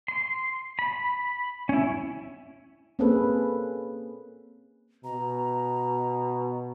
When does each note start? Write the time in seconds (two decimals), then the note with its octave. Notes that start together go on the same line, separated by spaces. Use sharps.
0.08 C6
0.79 B5
1.69 C#4 E4
2.99 A#3 C4 C#4 G#4 A4 B4
5.04 B2 A#5